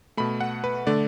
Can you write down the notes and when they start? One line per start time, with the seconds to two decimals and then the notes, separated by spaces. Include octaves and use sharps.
0.17 B2 A3 B5
0.41 F#5
0.64 B4
0.87 D3 A3 D5